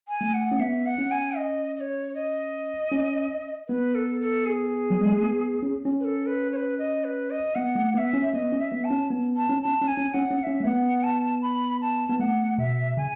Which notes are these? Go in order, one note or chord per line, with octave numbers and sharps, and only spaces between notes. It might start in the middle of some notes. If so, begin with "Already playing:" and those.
G#5
A3
F#5
C#4
B3 E5
F#5
C#4
G#5
D#5
D#5
C#5
D#5
C#4
B3 B4
A4
A4
G#4
F#3
G#3
A3
B3
C#4
C#4
B4
A4
B4
C#5
B4
D#5
B4
D#5
B3 F#5
A3
B3 E5 F#5
C#4
B3 D#5
C#4
E5
B3
A5
C#4
B3
A5
C#4
C#4 A5
C#4
G#5
C#4
C#4 F#5
C#4
F#5
C#4 E5
A3
B3 F#5
A5
B5
A5
B3
A3 F#5
B2 E5
C#3 G#5